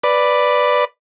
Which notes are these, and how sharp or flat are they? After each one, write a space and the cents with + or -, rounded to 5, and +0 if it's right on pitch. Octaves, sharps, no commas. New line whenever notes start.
B4 +0 D5 +0